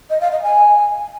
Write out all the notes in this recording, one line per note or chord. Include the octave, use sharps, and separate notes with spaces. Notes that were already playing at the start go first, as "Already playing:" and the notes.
D#5
F5
D#5
G#5